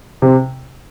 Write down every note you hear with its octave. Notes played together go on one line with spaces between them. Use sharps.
C3